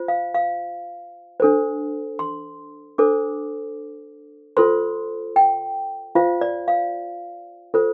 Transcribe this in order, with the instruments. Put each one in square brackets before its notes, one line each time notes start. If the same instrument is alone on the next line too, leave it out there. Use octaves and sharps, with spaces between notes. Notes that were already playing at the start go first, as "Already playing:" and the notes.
Already playing: [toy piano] F4 C5
F5
F5
D4 A4 C5
C6
D4 A4 C5 D6
F4 A4 C5 C6
G5
F4 C5 F5
D5
F5
F4 A4 C5